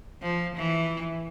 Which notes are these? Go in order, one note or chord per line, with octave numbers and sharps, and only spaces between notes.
F3
E3